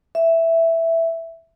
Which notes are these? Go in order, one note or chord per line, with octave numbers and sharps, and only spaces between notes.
E5